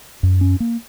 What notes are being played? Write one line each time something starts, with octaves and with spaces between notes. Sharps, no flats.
F#2
C#4
A#3